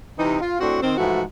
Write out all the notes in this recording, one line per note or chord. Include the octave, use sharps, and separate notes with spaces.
C3 E3 C4 D#4
F4
A2 C4 D4 F#4
D#3 C4
G#2 E3 F3 A3 E4 F#4